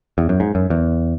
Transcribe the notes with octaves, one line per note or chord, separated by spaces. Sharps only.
E2
F#2
G#2
F#2
E2